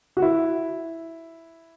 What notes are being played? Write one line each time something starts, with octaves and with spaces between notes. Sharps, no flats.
F#4
E4